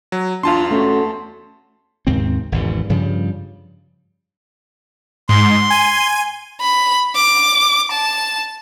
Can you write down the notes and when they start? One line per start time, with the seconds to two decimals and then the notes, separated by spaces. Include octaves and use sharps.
0.12 F#3
0.43 E2 D4 F4 F5 A5 C6
0.71 A3 C#4 F#4
2.07 D#2 G#2 C#3 C4
2.52 G#1 E2 C#3
2.89 G2 C#3 F3 G3
5.29 G#2 C6
5.70 G#5 D#7
6.61 B5
7.16 D6
7.92 A5